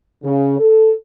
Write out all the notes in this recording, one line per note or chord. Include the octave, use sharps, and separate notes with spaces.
C#3
A4